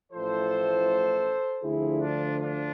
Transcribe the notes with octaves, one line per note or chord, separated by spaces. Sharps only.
A1 A2 F3 A4 C5
D2 D3 F3 E4 G#4
D4 F4
D4 F4